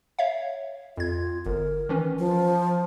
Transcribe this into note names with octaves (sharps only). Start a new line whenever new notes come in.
C#5 E5 F5
F2 F4 G#6
G1 A#4
D#3 E3 C#4
F3